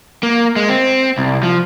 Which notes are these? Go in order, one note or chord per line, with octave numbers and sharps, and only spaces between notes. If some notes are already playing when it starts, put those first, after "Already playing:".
A#3
G#3
C4
C2
F3